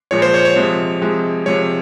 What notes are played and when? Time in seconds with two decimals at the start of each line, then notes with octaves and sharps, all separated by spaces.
0.11 A#2 F3 G#3 C#5
0.22 C5
0.34 C#5
0.45 C#5
0.56 C3 F3 G#3
1.02 C3 F3 G#3
1.46 C3 F3 G#3 C#5